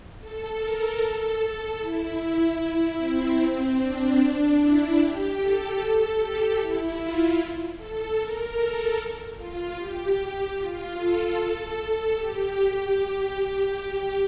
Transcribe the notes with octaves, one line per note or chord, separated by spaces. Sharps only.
A4
A#4
A4
A4
E4
C4
D4
D4
E4
G4
A4
A4
G4
E4
F4
A4
A#4
A4
F4
G4
G4
F4
A4
A4
G4
G4